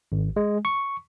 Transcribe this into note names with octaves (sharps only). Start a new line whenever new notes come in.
G#1
G#3
C#6